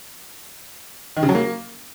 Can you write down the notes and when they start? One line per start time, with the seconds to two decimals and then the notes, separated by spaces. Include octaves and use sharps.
1.17 D#3
1.23 C#3
1.29 F#3
1.35 A#3